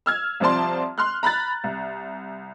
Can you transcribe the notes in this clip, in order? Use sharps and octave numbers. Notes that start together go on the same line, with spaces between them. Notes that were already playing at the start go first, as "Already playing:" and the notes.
E6 F6 G#6
C2 F3 C4 D5 A5 C6
C6 F6 F#6
A#5 B5 F#6 A6
C2